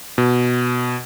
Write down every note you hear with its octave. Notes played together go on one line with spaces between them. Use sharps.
B2